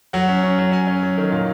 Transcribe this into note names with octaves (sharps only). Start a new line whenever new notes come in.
F#3 F#5
C#4
C#4
F#3
F#3 G#5
C#4
F#3
D#3
A#2 F5